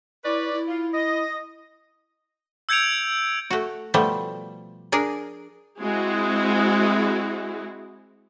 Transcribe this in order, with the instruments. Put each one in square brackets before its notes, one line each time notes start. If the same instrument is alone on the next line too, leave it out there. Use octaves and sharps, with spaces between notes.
[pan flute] E4 [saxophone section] B4 C#5 D5
[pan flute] E4
[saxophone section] F4
D#5
[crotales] E6 G6 G#6 C#7 D7 F7
[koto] A3 F#4
B2 F3 G3 A3
D4 G#4 A#4
[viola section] G#3 C4 E4 F#4 G#4